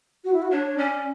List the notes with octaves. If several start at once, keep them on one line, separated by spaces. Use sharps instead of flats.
F#4
E4
F#4
D4 C#5
C#5
C#4 D5